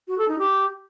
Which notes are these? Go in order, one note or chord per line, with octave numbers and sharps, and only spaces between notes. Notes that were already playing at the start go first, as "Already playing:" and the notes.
F#4
A4
D#4
G4